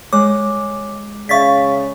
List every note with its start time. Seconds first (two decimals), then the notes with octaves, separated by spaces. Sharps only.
0.13 G#3 C#5 D6
1.29 C#3 D5 E5 F5 C#6 A6 B6